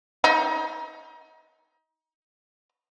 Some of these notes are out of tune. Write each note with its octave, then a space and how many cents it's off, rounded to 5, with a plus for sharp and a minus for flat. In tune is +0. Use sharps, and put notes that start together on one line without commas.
D#4 +30